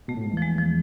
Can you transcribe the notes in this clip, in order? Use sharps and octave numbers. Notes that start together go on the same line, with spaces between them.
B2 A3
A2
G#2
E2 F3
G#3
F3